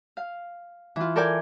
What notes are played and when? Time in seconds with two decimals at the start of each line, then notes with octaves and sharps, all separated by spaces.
0.17 F5
0.96 E3 F4
1.16 A4 A#4 D5 G5 G#5